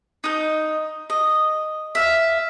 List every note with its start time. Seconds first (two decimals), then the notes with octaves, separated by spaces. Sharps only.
0.24 D#4 G6
1.10 D#5
1.95 E5 F5